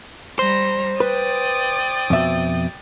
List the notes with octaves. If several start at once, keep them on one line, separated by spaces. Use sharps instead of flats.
G3 C5 A#5
B4 D5 G5 D#6
F2 B2 E5